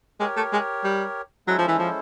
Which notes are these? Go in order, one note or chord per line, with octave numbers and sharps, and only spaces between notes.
G#3 G4 A#4 C#5
A3
G#3
G3
F#3 G#3 C#4 E4 A4 C5
F3
E3
F3